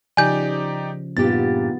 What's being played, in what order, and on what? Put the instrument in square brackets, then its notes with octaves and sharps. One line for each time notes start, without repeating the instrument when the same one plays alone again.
[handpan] C#3 F3 [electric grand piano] D#4 G4 D5 [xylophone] G#5 G6
[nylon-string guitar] G2 A#2 G4 [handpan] B3 D#4 G#4 [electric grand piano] A6